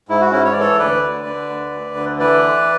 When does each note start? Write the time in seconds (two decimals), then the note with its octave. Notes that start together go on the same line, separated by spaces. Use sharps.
0.09 G#2 E4
0.21 F#4
0.32 G#2 C#4 E4
0.45 C#5
0.52 D5
0.56 E3 A4 C#5
0.79 D2 B4 D5
1.02 D3
1.26 D3
1.50 D2
1.72 D2
1.96 D3
2.19 E3 B4 D5